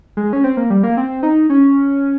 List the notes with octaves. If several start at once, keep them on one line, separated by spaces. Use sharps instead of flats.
G#3
C#4
C4
A#3
G3
A#3
C4
D#4
C#4